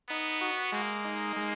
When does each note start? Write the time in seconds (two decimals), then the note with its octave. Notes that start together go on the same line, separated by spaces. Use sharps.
0.09 B3 D#4
0.41 F#4
0.72 G#3 A#3
1.05 D#4
1.36 G#3